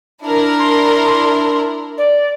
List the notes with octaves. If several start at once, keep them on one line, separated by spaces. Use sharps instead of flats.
D4 E4 A#4
C6
D5